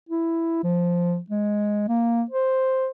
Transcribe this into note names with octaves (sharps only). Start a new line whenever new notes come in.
E4
F3
G#3
A#3
C5